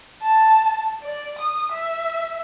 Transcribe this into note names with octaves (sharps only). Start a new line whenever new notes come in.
A5
D5
D#6
E5